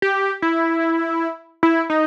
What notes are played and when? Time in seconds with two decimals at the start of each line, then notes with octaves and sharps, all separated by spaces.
0.02 G4
0.42 E4
1.63 E4
1.90 D#4